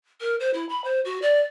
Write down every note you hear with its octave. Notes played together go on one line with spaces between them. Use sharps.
A#4
C5
E4
B5
C5
F#4
D5